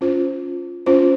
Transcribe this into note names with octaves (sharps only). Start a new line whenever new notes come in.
C#4 F4 C5
C#4 F4 C5